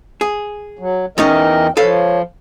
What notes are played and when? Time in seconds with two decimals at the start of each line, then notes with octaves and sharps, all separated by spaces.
0.21 G#4
0.79 F#3
1.18 E2 E3 C#4 D#4 A#4 D#5 G5
1.77 F3 A4 B4 C#5 F5